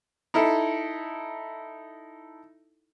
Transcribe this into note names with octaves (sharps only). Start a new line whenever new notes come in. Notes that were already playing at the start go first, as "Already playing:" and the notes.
D#4 E4 A4